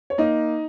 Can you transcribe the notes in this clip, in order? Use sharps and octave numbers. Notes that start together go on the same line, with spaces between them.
C#5
A#3 D#4 D#5